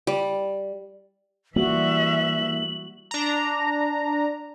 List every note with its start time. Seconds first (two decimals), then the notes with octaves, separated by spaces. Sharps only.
0.07 G3
1.56 E3 G3 A#3 F#4 E5 F#7
3.11 D4 A#5